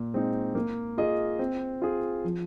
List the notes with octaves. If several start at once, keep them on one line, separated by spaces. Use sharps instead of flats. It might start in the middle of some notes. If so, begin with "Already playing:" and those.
Already playing: A#2
G#3 C4 D#4
A#3
F4 G#4 D#5
C4
F4 G#4
F3